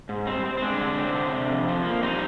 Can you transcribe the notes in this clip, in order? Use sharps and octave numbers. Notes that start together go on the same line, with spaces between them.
G#2
G3 C4
C4
C4
G#3 D4
D3
C4
D3
C3
F2
F3
A#3
G3 C4 D#4